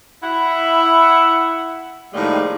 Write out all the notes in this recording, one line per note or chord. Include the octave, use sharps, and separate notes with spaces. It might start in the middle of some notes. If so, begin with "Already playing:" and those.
E4 E5 F#5
A2 D#3 F3 G3 G#3 A#3